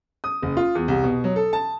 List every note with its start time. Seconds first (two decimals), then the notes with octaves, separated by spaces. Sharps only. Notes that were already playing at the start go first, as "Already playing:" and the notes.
0.24 D#6
0.42 F#1
0.57 F4
0.75 E2
0.88 C2
1.04 B2
1.24 F#3
1.36 A4
1.53 A5